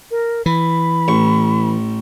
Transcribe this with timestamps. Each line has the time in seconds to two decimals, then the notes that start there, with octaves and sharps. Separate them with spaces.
0.11 A#4
0.46 E3 B5
1.08 A1 C#6